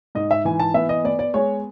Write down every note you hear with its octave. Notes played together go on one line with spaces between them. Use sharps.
G#2 D#5
E5
E3 G#5
A5
B3 E5
D#5
B3 D5
D5
G#3 C#5